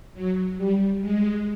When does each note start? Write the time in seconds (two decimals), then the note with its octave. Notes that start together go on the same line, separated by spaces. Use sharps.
0.14 F#3
0.58 G3
1.01 G#3